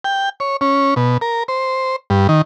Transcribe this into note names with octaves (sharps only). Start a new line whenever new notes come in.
G5
C#5
C#4
B2
A#4
C5
G2
D#3